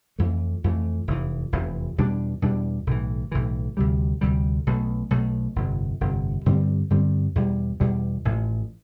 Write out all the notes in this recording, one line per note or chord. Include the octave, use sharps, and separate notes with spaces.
F2 E3 A3
F2 E3 A3
F1 E2 C3 E3
F1 E2 C3 E3
E2 B2 G3 D4
E2 B2 G3 D4
B1 A2 E3
B1 A2 E3
D2 C3 G3
D2 C3 G3
B1 B2 A3
B1 B2 A3
G1 F2 C3
G1 F2 C3
G2 D3 G3 C4
G2 D3 G3 C4
E2 B2 G3
E2 B2 G3
A1 A2 F3